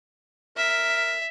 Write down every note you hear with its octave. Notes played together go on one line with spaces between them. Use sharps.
A#4 E5